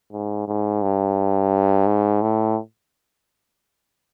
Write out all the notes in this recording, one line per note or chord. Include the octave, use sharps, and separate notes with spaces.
G#2
G#2
G2
G#2
A2